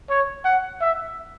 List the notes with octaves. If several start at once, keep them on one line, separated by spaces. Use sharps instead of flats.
C#5
F#5
E5